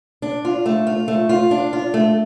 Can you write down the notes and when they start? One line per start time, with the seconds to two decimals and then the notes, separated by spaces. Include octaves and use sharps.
0.22 D4
0.45 F4
0.66 A3
0.87 F4
1.08 A3
1.29 F4
1.51 D4
1.73 F4
1.94 A3